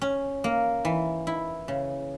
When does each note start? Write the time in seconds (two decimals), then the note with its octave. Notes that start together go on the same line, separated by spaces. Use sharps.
0.02 C#4
0.44 A#3
0.85 E3
1.27 E4
1.68 C#3